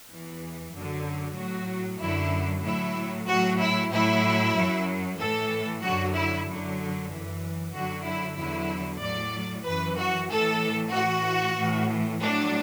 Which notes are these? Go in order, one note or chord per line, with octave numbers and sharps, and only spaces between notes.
E2 E3
F#2 D3 F#3
A2 F#3 F#4
F#2 D3 F#3 E4
A2 F#3 E4
A2 F#3 F#4
E4
A2 F#3 E4
F#2 F#3
A2 E3 A4
F#2 D3 F#3 F#4
E4
F#2 D3 F#3
F#2 E3
F#2 D3 F#3 F#4
E4
E2 D3 F#3 E4
A2 F#3 D5
F#2 E3 B4
F#4
A2 E3 A4
A2 E3 F#4
A2 E3
A2 F#3 D4